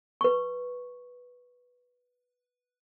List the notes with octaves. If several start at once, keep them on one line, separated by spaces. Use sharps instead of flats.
B4 C#6